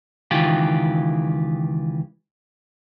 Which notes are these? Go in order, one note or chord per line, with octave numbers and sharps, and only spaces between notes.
C#2 D#3 E3 F4 G4